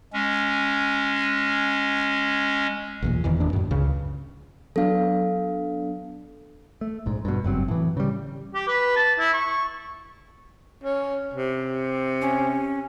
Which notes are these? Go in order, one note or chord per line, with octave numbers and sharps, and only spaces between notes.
G#3 C#4
B1 E2 A#2
E1 E2 D#3 E3
D#1 D#2 A2 D4
F#2 A2
C#2 C#3
F#3 B3 D4 A4 F5
A3
A#1 G#2
G2 B2
F#1 G2 F#3 C4
A2 E3
C#3 G3
G4
B4
A5
E4
C#6
C#4
C3
C#4